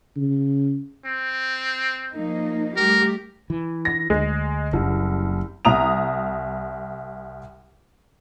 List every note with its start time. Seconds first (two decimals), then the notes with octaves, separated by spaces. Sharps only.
0.16 C#3
1.06 C4
2.15 F3 A#3 D#4
2.76 G3 A3 G4 A#4
3.50 E3
3.85 A#6
4.10 D2 G#3
4.73 F#1 C2 F#2
5.65 C2 A#5 D#6 F7